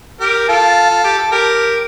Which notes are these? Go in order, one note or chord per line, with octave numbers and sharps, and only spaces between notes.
G4 A#4
F4 A4
F4
G4
A4
G4 A#4